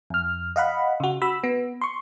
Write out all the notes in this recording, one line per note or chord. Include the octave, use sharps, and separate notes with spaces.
F2 F6
D#5 F5 F#5 B5
C#3 F#4
F#4 B5 E6
B3
C6 C#6